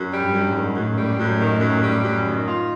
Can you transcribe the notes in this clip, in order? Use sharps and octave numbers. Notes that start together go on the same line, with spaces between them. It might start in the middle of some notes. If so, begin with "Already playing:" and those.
Already playing: F#2
G3
G2
F#2
G#2
D#3
F#2 A2
G3
F#2
D#3
F#2
G3
F#2
D#3
F4